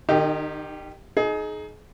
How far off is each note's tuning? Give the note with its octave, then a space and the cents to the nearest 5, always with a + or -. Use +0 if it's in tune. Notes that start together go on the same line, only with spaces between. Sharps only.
D#3 -40 D#4 +0 G4 +0
D#4 +0 G#4 +30